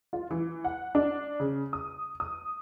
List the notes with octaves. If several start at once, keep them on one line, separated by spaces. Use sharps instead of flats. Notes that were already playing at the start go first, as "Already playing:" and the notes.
F4
E3
F#5
D4
C#3
D#6
D#6